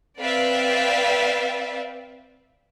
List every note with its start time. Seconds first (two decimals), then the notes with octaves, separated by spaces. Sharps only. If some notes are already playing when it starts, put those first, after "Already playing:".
0.19 C4 B4 D5 E5 F5 G5